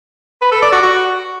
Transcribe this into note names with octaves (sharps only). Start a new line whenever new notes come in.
B4
A4
D5
F#4
F#4